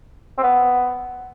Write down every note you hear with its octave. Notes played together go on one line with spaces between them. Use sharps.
C4
B3